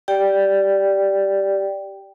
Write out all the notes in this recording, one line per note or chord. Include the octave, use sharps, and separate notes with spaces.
G4 D5 G5